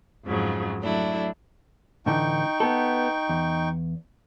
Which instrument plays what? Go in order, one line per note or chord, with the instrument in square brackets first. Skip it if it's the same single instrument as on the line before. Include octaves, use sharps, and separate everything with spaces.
[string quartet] F2 G#2 C#3 F3 F#3
F#3 A3 D4 E4
[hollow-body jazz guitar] A2 D3 E3 [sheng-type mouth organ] D#4 G5 C#6
[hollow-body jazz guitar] B3 A4
E2